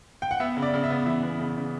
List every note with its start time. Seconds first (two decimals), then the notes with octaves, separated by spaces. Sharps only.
0.22 G5
0.31 F#5
0.40 B3 E5
0.57 C#3
0.63 D5
0.74 C#3
0.84 E5
0.90 B3
1.06 E3 E5
1.23 B3
1.40 C#3
1.56 C#3